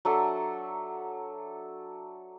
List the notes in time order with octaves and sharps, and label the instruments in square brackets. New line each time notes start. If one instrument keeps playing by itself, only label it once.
[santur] F#3 D4 A4 E5